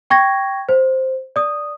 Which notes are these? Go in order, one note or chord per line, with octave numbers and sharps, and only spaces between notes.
G5 C#6 G#6 A#6
C5
D5 D#6